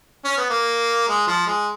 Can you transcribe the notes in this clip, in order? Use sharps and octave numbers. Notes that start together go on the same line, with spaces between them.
C#4
B3
A#3
G#3
F3
G#3